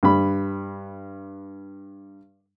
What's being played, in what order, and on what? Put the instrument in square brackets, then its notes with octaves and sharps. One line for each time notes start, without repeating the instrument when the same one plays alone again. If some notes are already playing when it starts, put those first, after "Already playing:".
[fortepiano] G2 B5